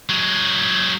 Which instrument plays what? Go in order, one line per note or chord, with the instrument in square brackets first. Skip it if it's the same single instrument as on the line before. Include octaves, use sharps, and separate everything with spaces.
[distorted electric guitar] F#3 G#3